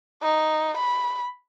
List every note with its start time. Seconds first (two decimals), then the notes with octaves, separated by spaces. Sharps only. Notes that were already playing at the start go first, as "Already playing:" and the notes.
0.23 D#4
0.77 B5